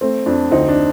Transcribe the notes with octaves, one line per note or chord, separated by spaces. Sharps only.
A3 C4
F2 D4
D2 C4 D#4
D4